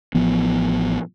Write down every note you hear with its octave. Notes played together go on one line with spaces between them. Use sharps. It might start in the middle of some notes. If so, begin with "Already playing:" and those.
A1 F3 B3